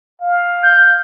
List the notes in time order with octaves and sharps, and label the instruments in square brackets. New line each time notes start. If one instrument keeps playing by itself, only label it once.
[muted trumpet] F5
[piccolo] G6